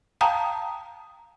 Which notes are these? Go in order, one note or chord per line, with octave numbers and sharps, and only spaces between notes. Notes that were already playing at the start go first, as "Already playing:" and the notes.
F5 G5 A5 A#5 D#6